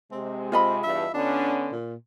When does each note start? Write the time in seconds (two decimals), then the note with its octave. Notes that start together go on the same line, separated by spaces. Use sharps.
0.12 C3 G#3 C4
0.52 C4 F4 D#5 B5
0.84 E2 G2 E5
1.14 D3 B3 C#4 D4
1.72 A#2